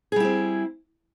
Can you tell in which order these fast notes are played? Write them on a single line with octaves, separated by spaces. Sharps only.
G#4 G3 E4 C4